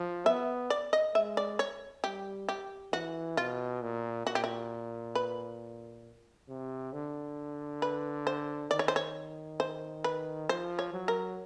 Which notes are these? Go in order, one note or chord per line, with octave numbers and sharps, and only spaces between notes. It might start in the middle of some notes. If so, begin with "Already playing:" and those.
Already playing: F3
B3 E5
D5
D#5
G#3 E5
D5
C#5
G3 G4
G4
E3 F#4
B2 F4
A#2
A#2 F#4
G4
F#4
B4
C3
D3
B4
C5
D#3 D5
C#5
C5
C#5
C5
B4
F3 C5
C#5
F#3
A#4